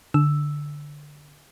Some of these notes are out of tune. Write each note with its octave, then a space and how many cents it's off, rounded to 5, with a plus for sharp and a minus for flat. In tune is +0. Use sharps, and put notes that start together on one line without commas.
D3 +0 E6 +0